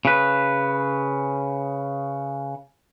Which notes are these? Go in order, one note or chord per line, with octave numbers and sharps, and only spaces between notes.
C#3 B4